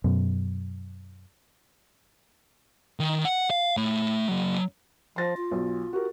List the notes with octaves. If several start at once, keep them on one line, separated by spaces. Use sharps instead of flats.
F#2 B2
D#3
F#5
F5
A3 C#5
F#3 A#3
F3 C6 A6 A#6
F4
B1
F#4 G4 A#4